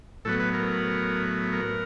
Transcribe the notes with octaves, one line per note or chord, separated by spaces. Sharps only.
A2 F#3 B3 A4
B4
A#4
A#4